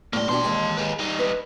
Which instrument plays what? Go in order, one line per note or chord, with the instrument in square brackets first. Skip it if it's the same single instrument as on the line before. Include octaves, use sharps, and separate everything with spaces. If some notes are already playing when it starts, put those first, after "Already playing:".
[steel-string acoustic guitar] A2 G3 [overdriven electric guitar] A#3 C6
[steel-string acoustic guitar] B2 D4 G4 [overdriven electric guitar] A4 C6
[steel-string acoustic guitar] D#2 G#3 G4
[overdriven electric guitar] G#4 B4
G3 D#4
[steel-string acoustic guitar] B4